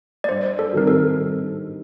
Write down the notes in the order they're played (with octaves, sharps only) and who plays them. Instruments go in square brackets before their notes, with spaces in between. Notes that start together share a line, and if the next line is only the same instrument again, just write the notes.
[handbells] D5
[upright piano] G2 [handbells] C5
[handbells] A4
[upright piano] D#3 G3 C4 G4 [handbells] A#4
[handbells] A4